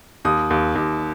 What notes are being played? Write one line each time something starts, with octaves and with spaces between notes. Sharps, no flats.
D#2 D#6
D#2
D#2